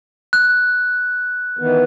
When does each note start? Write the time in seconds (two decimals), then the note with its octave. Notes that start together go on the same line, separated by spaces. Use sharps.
0.33 F#6
1.59 D#3 E3 B3